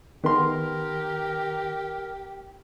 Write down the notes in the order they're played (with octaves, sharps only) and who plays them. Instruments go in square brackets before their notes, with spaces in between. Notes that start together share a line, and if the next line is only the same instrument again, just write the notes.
[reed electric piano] D#3 [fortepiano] B3 C6 [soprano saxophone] G4 [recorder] A#4